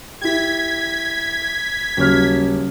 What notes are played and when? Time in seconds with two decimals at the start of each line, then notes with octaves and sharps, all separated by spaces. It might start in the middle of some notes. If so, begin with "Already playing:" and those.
0.21 E4 G4 G#6 B6
1.97 D#1 C#3 F#3 C#5 F6